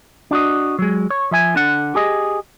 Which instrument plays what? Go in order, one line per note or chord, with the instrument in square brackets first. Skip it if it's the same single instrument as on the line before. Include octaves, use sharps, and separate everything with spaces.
[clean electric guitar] D4 F#4 D#5
F#3 G#3
C#5
F3 E5 G#5
D3 D4 F#5
G4 G#4 D#5